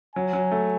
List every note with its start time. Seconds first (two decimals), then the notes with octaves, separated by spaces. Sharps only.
0.16 F#3 G#5
0.33 F#3
0.51 A3